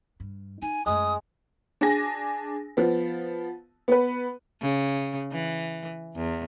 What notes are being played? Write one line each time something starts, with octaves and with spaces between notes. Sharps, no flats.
G2
D#4 G#5
F#2 G#3 A3 D#6
D4 G#4 G#5 A#6
F3 B3
B3 B4
C#3
E3
E2